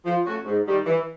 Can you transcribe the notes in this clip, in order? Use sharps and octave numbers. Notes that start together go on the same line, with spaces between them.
F3
A3 C#4 F#4
G#2
D#3 G3
E3